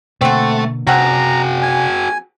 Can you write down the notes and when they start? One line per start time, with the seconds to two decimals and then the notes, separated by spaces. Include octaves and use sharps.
0.21 B2 D3 A3 A#3 C4 F#4
0.87 C3 F3 C4 F#4 G#4 F#5 A#5
1.63 G#5